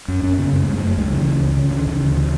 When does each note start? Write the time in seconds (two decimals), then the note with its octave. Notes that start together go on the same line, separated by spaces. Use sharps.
0.08 F#2 C#4
0.23 F#2 C#4
0.38 C#3 B3
0.53 F#2 B3
0.61 A3
0.68 F#2 G#3
0.78 F#2 A3
0.97 C#2 G#3
1.12 C#3 F#3
1.20 E3
1.28 C#2
1.43 C#2
1.57 C#3
1.64 D3
1.72 C#3
1.87 C#3 E3
2.02 D2
2.16 C#3